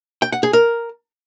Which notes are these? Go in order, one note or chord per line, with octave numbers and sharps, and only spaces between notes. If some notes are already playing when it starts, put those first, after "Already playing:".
G5
F#5
G#4
A#4